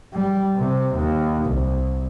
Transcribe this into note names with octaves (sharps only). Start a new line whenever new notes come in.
G3
C3
D#2
C2